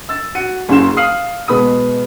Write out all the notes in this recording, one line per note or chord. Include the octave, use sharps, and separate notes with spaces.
E6 A6
F#4 C#7 D#7
F#1 F#2 C#3 C6 E7
F5 D#6 F6 C7 D#7 F#7
B2 G#3 B3 B5 D#6 D#7